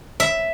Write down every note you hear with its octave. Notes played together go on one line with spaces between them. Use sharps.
E5